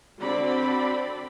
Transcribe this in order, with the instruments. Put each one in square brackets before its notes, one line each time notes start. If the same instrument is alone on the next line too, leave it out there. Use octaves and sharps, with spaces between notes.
[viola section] D3 C4 F#4 D5 B5